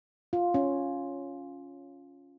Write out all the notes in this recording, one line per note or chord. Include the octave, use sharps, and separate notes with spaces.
F4
C#4